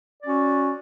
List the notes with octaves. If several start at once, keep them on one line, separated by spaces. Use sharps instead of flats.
C#4 F#4 D5